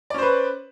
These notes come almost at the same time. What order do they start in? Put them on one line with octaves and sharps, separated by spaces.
D5 C#4 C5 B4